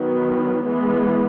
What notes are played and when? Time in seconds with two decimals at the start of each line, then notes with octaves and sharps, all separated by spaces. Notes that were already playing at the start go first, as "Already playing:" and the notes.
Already playing: D#3 F#3 B3
0.65 E3 G#3 B3